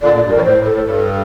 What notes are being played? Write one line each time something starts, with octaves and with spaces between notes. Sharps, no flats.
A#2 D3 D5
A#2
D5
G2
F2 A#4
D5
A2 C5
A2
A4
A2
G2 A4